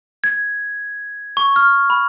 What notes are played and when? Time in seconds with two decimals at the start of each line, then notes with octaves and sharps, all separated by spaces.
0.24 G#6
1.37 C#6
1.56 F6
1.90 B5